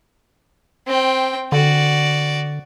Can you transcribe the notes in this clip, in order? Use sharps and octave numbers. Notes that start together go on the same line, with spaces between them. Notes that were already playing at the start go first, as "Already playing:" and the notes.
C4 G5
D3 F#4 D5